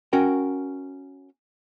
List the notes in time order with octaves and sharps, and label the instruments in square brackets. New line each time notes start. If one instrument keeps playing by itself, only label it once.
[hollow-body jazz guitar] C#4 F#4 A#4 G5